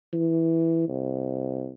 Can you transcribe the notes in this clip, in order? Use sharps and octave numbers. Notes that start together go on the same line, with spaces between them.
E3
C2